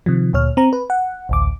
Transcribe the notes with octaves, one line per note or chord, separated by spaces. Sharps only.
C3 D#3 F3
D2 A#2 C#5 F6
C4 A#5
B4
F#5
A1 D2 D6